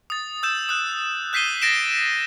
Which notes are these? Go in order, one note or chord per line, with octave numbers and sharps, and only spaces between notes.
D#6 A6
E6 G6 E7
D#6 F#6
F#6 G6 B6 C7 D#7 G7
A6 A#6 D7 E7